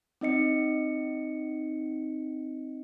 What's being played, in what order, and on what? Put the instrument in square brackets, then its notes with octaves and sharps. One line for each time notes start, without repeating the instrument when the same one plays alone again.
[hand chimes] C4 D#4 D#5 C#7